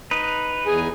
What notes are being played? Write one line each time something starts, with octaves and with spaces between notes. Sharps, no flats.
D#4 B4
E2 G#4 G#5